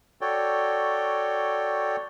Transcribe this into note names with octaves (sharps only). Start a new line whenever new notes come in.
F#4 A4 C#5 D5 G5